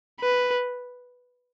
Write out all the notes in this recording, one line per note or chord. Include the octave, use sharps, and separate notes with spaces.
B4